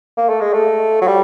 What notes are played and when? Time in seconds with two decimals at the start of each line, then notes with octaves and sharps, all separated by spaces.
0.17 A#3
0.29 A3
0.41 G#3
0.53 A3
1.02 F#3
1.07 G3